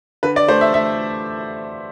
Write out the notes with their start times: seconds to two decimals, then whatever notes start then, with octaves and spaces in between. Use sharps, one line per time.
0.23 D3 B4
0.36 D5
0.48 A3 C5
0.61 E5
0.73 A3 E5